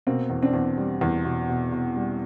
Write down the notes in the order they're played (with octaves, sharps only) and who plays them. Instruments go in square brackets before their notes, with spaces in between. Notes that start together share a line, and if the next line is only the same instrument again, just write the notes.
[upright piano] B2 A#3 C4
E2
C4 D4
E2
G3
E2
B2
B2
B2
G3